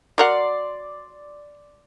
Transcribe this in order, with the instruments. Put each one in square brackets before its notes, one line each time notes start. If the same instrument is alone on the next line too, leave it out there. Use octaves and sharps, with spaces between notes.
[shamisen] F#3 A#4 F#5 [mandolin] D5 C6